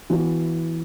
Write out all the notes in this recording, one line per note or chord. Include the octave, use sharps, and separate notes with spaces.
E3 B3 F#4